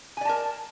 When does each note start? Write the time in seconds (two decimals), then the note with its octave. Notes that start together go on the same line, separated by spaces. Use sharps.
0.17 G#5
0.21 D5
0.25 A5
0.29 A#4